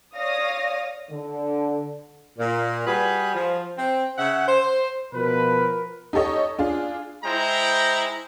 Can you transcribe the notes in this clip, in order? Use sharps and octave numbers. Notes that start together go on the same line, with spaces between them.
C#5 D5 F5 D#6 A#6
D3
A#2
G3 F#4 G#4 B4
F3
C4
C#3 E5 F#5
C5
B2 F3 A#4 B4
D#4 G4 A4 C#5 D#5
D4 F4 G#4
G#3 E4 C5 G5 A#5